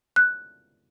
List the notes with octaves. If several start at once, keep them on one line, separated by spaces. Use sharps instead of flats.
F#6